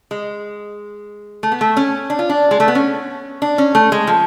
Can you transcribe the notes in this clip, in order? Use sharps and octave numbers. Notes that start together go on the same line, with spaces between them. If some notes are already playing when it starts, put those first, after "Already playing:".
G#3
A3
B3
A3
C#4
D4
F4
D4
G#3
A3
B3
C#4
D4
C#4
A3
G#3
F3